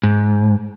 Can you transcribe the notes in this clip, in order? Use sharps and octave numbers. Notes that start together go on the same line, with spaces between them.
G#2